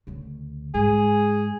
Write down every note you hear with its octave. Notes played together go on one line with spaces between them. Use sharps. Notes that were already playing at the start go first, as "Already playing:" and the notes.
D2 C#3
G#2 G#3 G#4